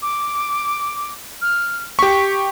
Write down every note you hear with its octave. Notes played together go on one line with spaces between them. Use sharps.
D6
F6
G4 C#6 B6